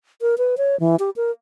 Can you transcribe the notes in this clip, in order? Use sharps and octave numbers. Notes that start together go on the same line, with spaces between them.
A#4
B4
C#5
E3
G4
A#4